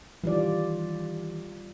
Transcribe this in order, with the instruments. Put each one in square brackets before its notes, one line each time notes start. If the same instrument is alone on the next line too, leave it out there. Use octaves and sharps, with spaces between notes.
[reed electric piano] D#3 E3 [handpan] G3 F4 D5